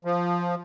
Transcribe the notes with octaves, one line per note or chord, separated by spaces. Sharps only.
F3